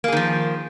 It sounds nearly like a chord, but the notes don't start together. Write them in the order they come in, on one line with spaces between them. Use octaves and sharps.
A#3 G#4 D#3 F3